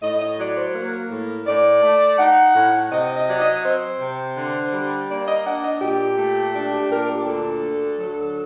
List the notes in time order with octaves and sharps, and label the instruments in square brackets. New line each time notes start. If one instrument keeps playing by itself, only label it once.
[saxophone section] A2 D#5
D#5
F#3 D5
C5
A#3 A#4
A2
A2 D5
A3
D#4 F#5
A2
C3 D#5
D#5
F#3 D5
D#5
C4 C5
C3
D3
G3
A#3 D5
D#5
D4 F#5
D#5
A#2 G4
A3
D4 G4
G4
A#2 A#4
G4
D2 A4
D3
F#3